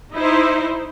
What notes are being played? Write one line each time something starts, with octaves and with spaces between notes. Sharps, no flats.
D#4 E4 C5